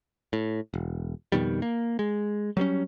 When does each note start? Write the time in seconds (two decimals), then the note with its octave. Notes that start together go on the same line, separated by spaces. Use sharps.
0.33 A2
0.74 E1
1.32 F2 B2 D#3 G3
1.62 A#3
1.99 G#3
2.57 F#3 G3 B3 C#4